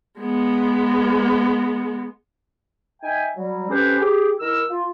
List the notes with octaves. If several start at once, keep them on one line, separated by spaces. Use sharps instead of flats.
G#3 B3
D#4 E5 G5 G#5
F#3 G3
C4 C#4 G4 A4 B4 C5
G4 G#4
D#3 E4 A#4 E6
F4